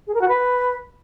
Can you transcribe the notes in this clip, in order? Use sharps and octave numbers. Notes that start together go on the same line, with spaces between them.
G#4
A#4
F#4
B4